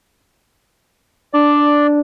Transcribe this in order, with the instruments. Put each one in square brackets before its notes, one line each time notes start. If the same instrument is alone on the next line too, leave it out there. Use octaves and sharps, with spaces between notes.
[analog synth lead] D4 [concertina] D5